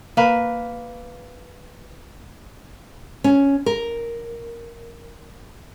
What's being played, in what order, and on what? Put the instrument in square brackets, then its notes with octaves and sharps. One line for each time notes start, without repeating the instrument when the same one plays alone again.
[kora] A#3 B4
[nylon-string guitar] C#4
A#4